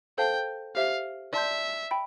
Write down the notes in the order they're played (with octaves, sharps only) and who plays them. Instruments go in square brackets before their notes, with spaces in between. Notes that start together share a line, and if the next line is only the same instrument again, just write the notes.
[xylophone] A4 C5 F5 A5 [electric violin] G5
[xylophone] G4 C5 E5 [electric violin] F5
[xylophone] D5 A5 C6 G6 [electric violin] E5
[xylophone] G5 B5